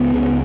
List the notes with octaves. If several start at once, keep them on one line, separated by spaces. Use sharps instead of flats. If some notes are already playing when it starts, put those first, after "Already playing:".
Already playing: C#2 B3
C#3